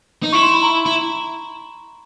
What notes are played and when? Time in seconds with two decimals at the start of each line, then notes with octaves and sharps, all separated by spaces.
0.23 D#4
0.32 E4 C#6
0.42 C6
0.53 B5
0.62 A#5
0.86 E4